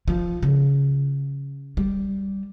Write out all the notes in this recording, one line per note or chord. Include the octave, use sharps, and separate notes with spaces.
F3
C#3
G3